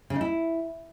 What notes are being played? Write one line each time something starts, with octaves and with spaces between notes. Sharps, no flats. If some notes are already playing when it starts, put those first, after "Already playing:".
C#3
D#4
E4